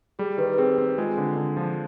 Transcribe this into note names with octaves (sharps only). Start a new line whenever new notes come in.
G3 G#4
D#3 B4
B4
C4 G#4
C4
G#3 F4
D3
D3
F3